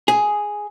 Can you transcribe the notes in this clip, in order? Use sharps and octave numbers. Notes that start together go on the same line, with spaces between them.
G#4